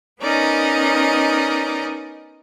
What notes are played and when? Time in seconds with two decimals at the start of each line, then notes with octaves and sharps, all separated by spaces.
0.22 B3 C#4 D#4 A#4 D5 D#5